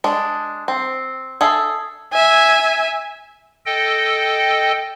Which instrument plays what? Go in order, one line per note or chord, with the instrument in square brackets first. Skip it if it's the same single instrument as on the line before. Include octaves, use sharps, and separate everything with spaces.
[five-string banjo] G#3 D4
C4
G#4 A4 E5
[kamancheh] E5 G#5
[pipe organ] A4 D#5 G5